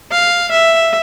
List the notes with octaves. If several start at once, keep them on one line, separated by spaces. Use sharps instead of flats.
F5
E5